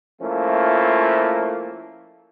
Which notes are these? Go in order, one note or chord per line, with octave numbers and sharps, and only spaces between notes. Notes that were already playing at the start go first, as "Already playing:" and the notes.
F3 A3 A#3 C#4 E4